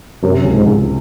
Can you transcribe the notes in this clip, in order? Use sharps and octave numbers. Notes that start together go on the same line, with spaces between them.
F#2 C3
C#2
G#2
C#2